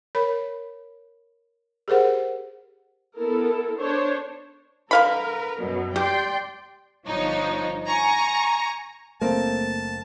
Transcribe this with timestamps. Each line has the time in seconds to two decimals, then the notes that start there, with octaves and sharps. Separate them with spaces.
0.15 A#4 C#5 B5
1.88 G4 G#4 A#4 C5 F#5
3.17 B3 E4 A4 A#4
3.78 D4 C5 C#5
4.91 D3 A#4 B4 F5 B5
5.60 F#2 B2 F#3
5.96 G4 D5 G5 C6
7.06 G1 F3 D4 D#4 C#5
7.86 G#5 A#5 C#6
9.21 F#1 A3 A#3 C4 A5